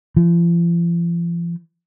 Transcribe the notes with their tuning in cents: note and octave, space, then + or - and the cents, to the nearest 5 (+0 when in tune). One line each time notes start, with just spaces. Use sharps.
F3 -40